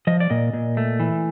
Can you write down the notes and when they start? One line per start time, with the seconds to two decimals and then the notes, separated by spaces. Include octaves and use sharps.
0.07 F3 D#5
0.20 D5
0.30 A#2 D#5
0.53 A#2
0.77 A3
1.00 E3